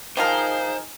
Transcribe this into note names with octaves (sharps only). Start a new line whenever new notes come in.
D#3 F3 D#4 G#4 A#4 C5 F5